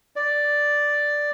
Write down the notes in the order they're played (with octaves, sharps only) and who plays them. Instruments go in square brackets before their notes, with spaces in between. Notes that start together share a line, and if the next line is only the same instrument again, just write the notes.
[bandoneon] D5